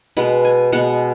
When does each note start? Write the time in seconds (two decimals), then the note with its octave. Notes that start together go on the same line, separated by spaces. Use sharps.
0.17 B2 G#3 B3 B5
0.45 G#5
0.72 B2 G#3 B3 F#5